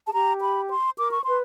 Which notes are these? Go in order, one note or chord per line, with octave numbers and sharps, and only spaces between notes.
G#4 A5
G4 A#5
B5
C6
A#4 D6
C#6
B4 C6